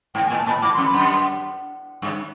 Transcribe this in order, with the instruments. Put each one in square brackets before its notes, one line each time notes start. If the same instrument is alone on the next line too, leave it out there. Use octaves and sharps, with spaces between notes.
[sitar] G#2 [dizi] G5
[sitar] A2 [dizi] G#5
[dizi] A5
[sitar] A2
[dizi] B5
[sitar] G#2 [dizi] D6
[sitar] F2 [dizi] C6
[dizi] B5
[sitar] F#2 [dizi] C6
[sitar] G2